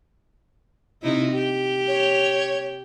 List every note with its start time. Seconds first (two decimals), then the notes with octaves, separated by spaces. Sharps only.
1.02 C3 D#4 E4
1.32 G4
1.88 C#5